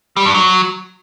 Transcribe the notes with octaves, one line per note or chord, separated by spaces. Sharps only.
G3
G2
F#3